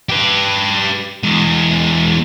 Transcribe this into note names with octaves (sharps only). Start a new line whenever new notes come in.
G4 B4
E2 G#3